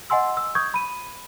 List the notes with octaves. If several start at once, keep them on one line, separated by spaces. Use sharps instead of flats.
D#5 F#5 G#5 C6 E6
E6
C#6 D#6 G6 G#6
B5 D#7